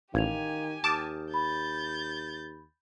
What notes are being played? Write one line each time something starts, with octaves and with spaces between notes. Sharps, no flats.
A1 D#3 G4 F5 G#5 G#6 F7
D#2 A5 D6 D#6 F6 G6
B5 G6 A6